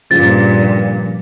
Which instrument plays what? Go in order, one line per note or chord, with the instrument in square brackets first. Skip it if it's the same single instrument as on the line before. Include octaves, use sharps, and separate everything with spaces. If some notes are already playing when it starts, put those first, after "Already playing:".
[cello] G2 A#2 [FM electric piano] C#3 F3 [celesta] A6